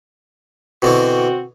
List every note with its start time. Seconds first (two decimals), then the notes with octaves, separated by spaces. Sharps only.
0.82 B2 D3 E3 C4 F#4